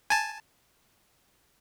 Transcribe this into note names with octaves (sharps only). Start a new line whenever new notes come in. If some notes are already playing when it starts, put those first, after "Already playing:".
G#5 A5